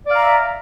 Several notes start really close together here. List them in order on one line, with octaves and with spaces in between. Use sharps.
D5 F5 A#5 E5